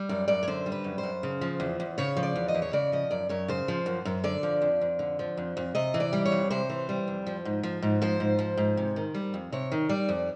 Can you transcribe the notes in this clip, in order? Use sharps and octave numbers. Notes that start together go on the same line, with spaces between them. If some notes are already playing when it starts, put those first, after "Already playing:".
Already playing: G3
F#2 D5
F#2 D5
C#5
D3 C5
G3
B4
F#2
C5
F#2
C#3
F3
E2
E2
C#3 C#5
F3
D5
E2
D#5
E2
C#5
C#3 D5
F3 D#5
F#2 D5
F#2 C#5
C#3 C5
F3
F#2
F#2
D3 D5
F3
F2
F2
D3
F3
F2
F2
C3 D#5
E3
D5
G3
C#5
F2
C3 C5
E3
G3
F2
F3
G#2
F3
G#2
F3 C5
G#2
F3
G#2
C3
D#3
G3
F2
C3 C#5
D#3
G3 D5
F2